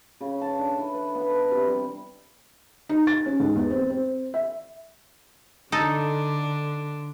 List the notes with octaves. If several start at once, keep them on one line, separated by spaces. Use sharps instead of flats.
C#3
A5
D4
E3
B4
B3
B4
C3
G3
D#4
A6
C#4
G#2
E2
C4
C4
E5
D3 D4 D#4 A4